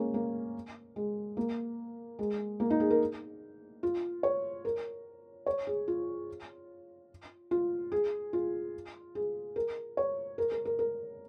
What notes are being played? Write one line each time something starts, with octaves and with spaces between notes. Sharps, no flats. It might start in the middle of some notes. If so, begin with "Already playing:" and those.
Already playing: G#3 A#3 C#4
A#3
G#3
A#3
G#3
A#3
D#4
G#4
A#4
F4
C#5
A#4
C#5
G#4
F4
F4
G#4
F4
G#4
A#4
C#5
A#4
A#4
A#4
A#4